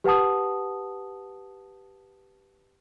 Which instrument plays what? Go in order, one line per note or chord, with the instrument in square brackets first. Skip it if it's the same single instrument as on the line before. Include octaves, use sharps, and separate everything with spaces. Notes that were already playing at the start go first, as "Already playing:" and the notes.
[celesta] G4 B4 F#5 A5 D#6